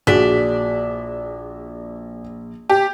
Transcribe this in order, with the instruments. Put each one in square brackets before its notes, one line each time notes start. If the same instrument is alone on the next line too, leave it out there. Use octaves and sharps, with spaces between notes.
[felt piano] A#1 B6 [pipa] D4 [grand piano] F#4 G#4
[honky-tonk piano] G4